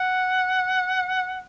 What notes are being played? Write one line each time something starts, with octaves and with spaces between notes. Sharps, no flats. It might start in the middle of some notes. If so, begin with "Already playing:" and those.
Already playing: F#5